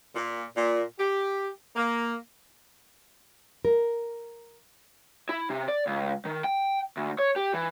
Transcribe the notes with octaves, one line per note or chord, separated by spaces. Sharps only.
A#2
A#2
G4
A#3
A#4
E4
C3
D5
C#2
D#3
G5
D2
C#5
G4
E3